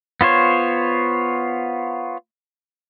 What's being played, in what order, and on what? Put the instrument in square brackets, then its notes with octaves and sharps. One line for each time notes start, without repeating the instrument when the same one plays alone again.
[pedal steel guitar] B3 F4 C5 C#5